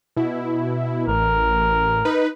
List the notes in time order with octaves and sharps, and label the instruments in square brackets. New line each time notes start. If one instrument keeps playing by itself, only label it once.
[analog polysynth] B2 E4
[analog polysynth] A1 [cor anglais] A#4
[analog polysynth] D#4 B4